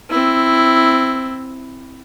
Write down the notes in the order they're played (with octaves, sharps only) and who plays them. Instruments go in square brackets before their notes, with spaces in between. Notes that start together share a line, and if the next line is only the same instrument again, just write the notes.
[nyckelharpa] C4 E4